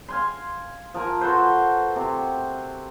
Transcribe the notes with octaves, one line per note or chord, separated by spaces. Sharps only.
F5 G#5 C6
F3 A#4 G#5
F#4 A4 B4 C5
C3